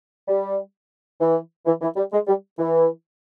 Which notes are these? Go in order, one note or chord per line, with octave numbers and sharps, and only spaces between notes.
G3
E3
E3
E3
G3
G#3
G3
E3